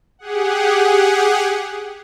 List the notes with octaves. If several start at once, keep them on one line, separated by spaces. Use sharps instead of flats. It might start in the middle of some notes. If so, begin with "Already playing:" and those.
G4 G#4 F#5